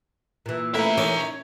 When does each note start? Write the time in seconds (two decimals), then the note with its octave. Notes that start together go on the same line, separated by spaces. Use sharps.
0.46 A#2 E3
0.74 A3 C#4 E4 A#4 B4 E5 A#5
0.98 E3 C#4 D#4 A#4 D5
1.17 C#5